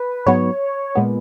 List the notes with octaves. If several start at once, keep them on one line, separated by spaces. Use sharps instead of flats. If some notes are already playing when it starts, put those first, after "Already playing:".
Already playing: B4
G#2 F#3 B3 C#5
A#2 G#3 B3